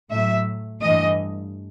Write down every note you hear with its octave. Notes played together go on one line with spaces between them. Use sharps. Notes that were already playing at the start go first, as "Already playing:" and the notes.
A2 F#3 A3 E5
G2 E3 A3 D#5